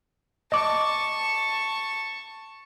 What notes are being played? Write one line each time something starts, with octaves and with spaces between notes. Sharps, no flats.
D#5 A5 C#6 D6